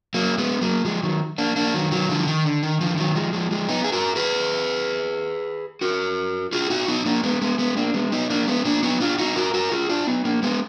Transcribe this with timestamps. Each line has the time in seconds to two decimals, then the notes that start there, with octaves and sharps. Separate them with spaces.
0.14 F#3 A#3
0.38 G#3 B3
0.61 F#3 A#3
0.85 F3 G#3
1.03 D#3 F#3
1.38 A#3 D4
1.56 A#3 D4
1.74 D#3 F#3
1.92 D#3 F#3
2.09 D3 F3
2.27 D#3
2.44 D3
2.63 D#3
2.81 D3 F3
2.98 D#3 F#3
3.15 F3 G#3
3.33 F3 G#3
3.51 F3 G#3
3.69 B3 D#4
3.84 G#4
3.92 F#4 A#4
4.16 G#4 B4
5.81 F#4 A#4
6.53 F4 G#4
6.70 D#4 F#4
6.88 B3 D#4
7.06 A#3 D4
7.23 G#3 B3
7.41 G#3 B3
7.58 G#3 B3
7.77 A#3 D4
7.94 G#3 B3
8.12 B3 D#4
8.30 A#3 D4
8.48 G#3 B3
8.65 A#3 D4
8.83 B3 D#4
9.00 D4 F4
9.19 D#4 F#4
9.36 F#4 A#4
9.54 F#4 A#4
9.71 F4 G#4
9.89 D4 F4
10.07 B3 D#4
10.25 A#3 D4
10.43 G#3 B3